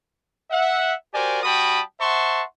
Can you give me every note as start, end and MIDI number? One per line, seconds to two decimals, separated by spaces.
0.51 0.94 76
0.51 0.94 78
1.13 1.41 66
1.13 1.41 67
1.13 1.41 70
1.13 1.41 72
1.13 1.41 74
1.13 1.41 80
1.44 1.81 55
1.44 1.81 66
1.44 1.81 79
1.44 1.81 81
1.44 1.81 83
1.44 1.81 87
2.00 2.42 72
2.00 2.42 76
2.00 2.42 78
2.00 2.42 81
2.00 2.42 84
2.00 2.42 85